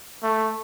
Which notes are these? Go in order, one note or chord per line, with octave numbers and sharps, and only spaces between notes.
A3